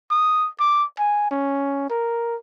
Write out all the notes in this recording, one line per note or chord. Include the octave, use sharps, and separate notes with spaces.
D#6
D6
G#5
C#4
A#4